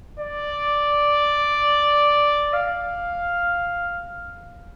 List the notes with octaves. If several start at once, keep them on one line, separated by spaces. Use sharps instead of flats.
D5
F5